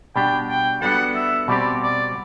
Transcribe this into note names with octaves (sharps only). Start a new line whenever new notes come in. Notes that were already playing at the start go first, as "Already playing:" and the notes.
B2 G3 D4 G4 G5
G5
G3 B3 D4 F#4 A4 F#5
E5
B2 G3 C4 G4 D5
D5